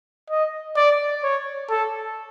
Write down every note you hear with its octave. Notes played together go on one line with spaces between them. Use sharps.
D#5
D5
C#5
A4